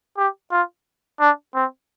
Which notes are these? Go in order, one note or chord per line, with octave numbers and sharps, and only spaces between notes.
G4
F4
D4
C4